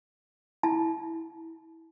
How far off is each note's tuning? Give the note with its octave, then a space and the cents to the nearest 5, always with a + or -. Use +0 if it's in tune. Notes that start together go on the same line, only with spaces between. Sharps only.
E4 -20 A5 -35